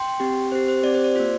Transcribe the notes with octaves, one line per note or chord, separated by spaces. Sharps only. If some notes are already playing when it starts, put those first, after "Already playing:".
Already playing: G5 C6
C4 G4
C4 G4 C5
C5
C4 G4 D5
C5
D5
A#3 F4 C5